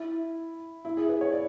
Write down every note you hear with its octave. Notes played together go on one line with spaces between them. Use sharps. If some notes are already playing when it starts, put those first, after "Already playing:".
Already playing: E4
E4
G#4
B4
C#5
D5